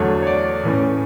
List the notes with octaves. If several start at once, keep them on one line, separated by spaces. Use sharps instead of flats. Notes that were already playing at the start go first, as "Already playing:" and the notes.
Already playing: E2 D3 F#3 A3 D4 C#5
C#5
D5
A2 E3 A3 C#4